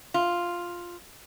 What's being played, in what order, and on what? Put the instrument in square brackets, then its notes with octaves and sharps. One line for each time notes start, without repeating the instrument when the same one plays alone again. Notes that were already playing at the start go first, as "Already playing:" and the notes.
[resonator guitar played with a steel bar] F4